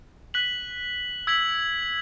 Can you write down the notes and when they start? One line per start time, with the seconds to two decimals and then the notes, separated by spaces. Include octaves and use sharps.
0.34 F#6 B6 F#7
1.27 E6 G#6 B6 F#7